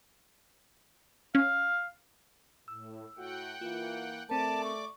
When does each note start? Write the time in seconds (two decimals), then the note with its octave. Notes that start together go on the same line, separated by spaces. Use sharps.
1.35 C#4 F5
2.68 A2 E6
3.17 A2 F#4 F#5 G5
3.61 E3 A#3 F4
4.30 A3 C4 A#4 D5 A5 D6
4.64 C#6